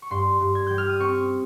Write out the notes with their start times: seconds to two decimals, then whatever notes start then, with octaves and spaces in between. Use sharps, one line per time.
0.02 C#6
0.10 G2 C6
0.40 G2
0.55 G#6
0.67 G3 G6
0.78 F6
0.89 D#6
1.00 C4 C#6